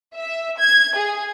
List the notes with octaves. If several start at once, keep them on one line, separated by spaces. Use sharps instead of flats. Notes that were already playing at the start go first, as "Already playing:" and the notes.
E5
G#6
G#4